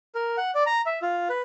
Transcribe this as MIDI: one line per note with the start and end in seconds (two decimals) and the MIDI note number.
0.15 0.37 70
0.37 0.51 78
0.55 0.63 74
0.66 0.82 82
0.86 0.99 76
1.02 1.28 65
1.29 1.42 71